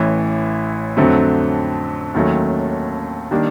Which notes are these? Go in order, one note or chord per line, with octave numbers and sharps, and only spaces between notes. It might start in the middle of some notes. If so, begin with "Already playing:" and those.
Already playing: A1 A2 E3
F2 D3 F#3 A3 C4
D#2 D#3 F#3 A3 C#4
D#3 G3 A#3 D4